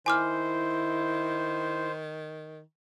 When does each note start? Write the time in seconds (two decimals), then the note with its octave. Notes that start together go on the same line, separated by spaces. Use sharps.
0.06 D#3 E4 C5 G#5 D6 F6